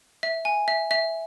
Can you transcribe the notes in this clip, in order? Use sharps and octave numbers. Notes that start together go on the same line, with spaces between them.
E5
G#5
E5
E5